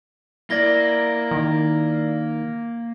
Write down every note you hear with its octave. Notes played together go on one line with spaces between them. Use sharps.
A#3 E4 D5 G#6 A#6 G7
D#3